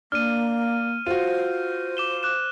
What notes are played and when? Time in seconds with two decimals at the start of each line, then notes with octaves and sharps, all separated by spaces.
0.12 A#3 D4 F6 D#7
1.07 F4 F#4 C5 D#7
1.97 D6 E7 G7
2.23 D6 F#6 E7